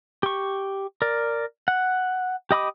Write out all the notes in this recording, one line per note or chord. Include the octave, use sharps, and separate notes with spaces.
G4 C#6
A#4 D5
F#5
G4 D#5 B5 D6 D#6